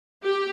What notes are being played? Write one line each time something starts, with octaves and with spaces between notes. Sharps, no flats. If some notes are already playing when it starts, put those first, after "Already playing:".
G4